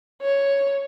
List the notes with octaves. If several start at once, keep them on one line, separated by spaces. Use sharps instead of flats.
C#5